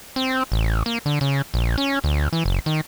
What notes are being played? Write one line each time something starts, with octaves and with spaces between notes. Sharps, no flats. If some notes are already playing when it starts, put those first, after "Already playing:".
C4
A1
A#3
D3
C#3
A#1
C#4
D2
E3
F#1
D#3